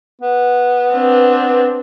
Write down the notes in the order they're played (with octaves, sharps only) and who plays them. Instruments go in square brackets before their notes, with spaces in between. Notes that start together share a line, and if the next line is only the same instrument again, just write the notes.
[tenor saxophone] B3
[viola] C4 D4 [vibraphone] B4